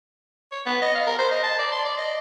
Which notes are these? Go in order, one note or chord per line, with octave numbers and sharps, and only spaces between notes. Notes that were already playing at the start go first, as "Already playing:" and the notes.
C#5
B3
D#5
F5
A#4
C5
D#5
A5
D5
C6
D5
D#5